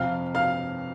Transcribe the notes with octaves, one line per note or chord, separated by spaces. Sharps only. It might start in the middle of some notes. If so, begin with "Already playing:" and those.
Already playing: F2 C3 F3 F5 F6
F5 F6